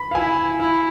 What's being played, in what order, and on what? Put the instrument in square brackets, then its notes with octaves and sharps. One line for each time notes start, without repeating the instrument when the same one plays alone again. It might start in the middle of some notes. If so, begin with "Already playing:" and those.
Already playing: [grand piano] B5
F5
[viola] E4 [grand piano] G#5
[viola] E4 [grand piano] F5